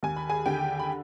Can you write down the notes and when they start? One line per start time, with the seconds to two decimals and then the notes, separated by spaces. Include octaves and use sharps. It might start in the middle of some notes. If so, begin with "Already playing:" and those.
0.03 D#2 G#5
0.16 B5
0.30 G#4 G#5
0.46 D3 G4 G5
0.79 B5